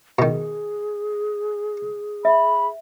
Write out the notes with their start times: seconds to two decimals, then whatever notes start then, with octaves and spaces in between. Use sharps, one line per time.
0.19 B2 D#3 G#4
2.25 E5 B5